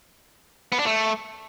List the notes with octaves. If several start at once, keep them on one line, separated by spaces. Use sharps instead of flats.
B3
D4
A3